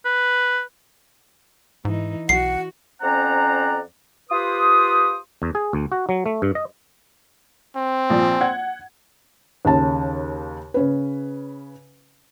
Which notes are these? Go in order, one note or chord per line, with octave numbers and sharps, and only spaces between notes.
B4
G#2 E3 D#4
B1 F#4 F#5 C7
F2 C#4 C5 D5 F#5 A#5
F4 G4 B4 C5 D#6
E2
G#4
D2
F#4
F#3
A3
G2
D#5
C4
A#1 F3 D5
F#5 G#6
D#2 C#3 A5
C#3 C#4 B4